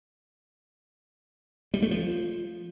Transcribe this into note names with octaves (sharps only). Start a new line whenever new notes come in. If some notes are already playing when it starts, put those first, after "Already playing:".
G3
A3
F3